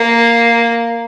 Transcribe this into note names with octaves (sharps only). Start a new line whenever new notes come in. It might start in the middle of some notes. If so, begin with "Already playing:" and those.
Already playing: A#3